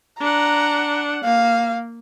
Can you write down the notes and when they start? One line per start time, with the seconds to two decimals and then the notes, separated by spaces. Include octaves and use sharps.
0.20 D4 F#5 A#5
1.24 A#3 F5